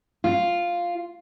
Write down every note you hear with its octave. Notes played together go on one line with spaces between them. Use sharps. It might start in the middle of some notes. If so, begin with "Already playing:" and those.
F4